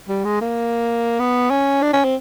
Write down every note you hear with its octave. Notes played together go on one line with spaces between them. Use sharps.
G3
G#3
A#3
B3
C#4
D4
C#4
C4